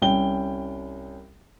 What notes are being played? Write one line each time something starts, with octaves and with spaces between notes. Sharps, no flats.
C2 C#4 G5 G7